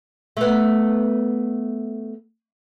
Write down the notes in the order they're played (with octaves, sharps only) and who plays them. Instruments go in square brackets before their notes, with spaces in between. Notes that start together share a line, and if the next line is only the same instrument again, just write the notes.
[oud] A3 B3